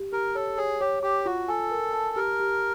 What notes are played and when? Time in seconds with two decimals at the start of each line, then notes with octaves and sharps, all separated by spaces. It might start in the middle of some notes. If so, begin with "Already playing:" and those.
Already playing: G4
0.12 G4 A#4
0.35 A4 C#5
0.57 G#4 C#5
0.81 G4 C#5
1.03 G4 D6
1.26 F4 F#4
1.48 A4 G#5
1.71 A#4
1.93 A5
2.16 G4 A#4
2.40 G4